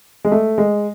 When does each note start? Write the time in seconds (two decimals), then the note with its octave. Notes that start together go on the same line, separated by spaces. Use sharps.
0.25 G#3
0.32 A3
0.58 G#3